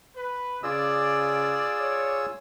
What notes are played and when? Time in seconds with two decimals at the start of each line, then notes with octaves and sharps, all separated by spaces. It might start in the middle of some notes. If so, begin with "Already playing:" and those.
0.16 B4
0.63 C#3 F4 G#4 D5 E6
1.81 C#5